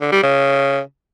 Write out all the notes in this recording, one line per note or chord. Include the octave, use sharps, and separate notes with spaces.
D3
G3
C#3